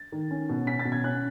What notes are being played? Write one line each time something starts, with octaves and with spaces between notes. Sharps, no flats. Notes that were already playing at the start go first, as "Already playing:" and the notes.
Already playing: A6
D#3
C#4
B2
C#4 B6
A6
B2
G#6
C#4 F#6